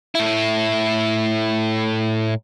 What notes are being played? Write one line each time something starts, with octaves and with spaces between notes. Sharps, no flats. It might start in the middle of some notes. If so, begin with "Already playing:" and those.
A2 E4